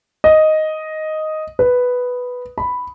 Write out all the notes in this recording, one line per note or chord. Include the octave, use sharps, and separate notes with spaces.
D#5
B4
B5